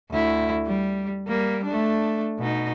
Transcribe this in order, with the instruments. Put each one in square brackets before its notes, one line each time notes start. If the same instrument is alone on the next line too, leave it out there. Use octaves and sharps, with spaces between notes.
[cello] D2 E4
G3
G3 A#3
A3 D4
B2 D#4